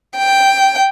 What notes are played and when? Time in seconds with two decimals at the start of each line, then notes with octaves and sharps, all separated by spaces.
0.17 G5